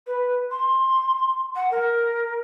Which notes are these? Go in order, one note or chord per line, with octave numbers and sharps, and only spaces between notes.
B4
C6
F#5
A#4